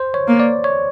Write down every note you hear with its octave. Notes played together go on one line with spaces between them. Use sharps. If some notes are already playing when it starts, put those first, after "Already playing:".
Already playing: C5
C#5
A#3
D5
C#5